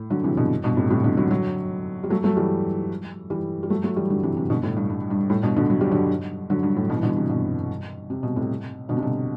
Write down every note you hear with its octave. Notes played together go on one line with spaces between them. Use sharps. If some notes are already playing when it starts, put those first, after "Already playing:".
Already playing: A2
D3 F#3
C3 E3
B2 D3
G2 B2
A2 C3
A2 C3
B2 D3
D3 F#3
D3 F#3
G3
F#3 A3
F#3 A3
E3 G3
E3 G3
G3
F#3 A3
F#3 A3
E3 G3
D3 F#3
C3 E3
C3 E3
B2 D3
A2
G2
G2
G2
A2
G2 B2
B2 D3
F#3
G3
D3 F#3
D3 F#3
G2
A2
G2 B2
E3
B2 D3
C3 E3
B2 D3
C3
B2
A2 C3
B2 D3
C3
B2 D3